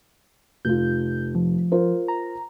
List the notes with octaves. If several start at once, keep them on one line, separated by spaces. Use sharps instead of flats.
F1 F4 G6
F3
F4 A#4 C5
A#5